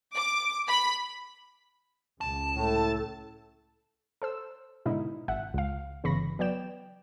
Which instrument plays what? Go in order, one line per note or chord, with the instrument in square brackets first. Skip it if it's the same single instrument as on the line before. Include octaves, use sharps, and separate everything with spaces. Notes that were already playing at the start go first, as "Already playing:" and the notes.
[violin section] D6
B5
[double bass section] C#2 [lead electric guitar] A5
[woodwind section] A2 A3 [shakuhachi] A4
[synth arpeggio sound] A4 C5 E6
G#2 B2 D3 D#4 E4
G#1 E5 F#5
C#2 F5
G1 C#3 E3 B5 C#6 A#6
F#3 B3 D5 G5 E7